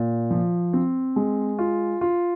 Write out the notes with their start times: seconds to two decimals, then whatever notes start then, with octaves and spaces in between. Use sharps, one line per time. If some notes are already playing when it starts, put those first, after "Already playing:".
Already playing: A#2
0.31 F3
0.73 C4
1.16 G#3
1.59 F4
2.01 F4